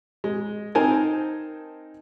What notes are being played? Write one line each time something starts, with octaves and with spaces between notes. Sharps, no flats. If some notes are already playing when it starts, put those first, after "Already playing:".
G#3
C4 D#4 A#4 C5 G#5 A5